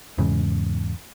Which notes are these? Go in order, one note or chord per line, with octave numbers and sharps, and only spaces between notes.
E2 G#2 C#3